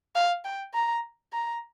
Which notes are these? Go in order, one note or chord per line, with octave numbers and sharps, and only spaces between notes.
F5
G5
A#5
A#5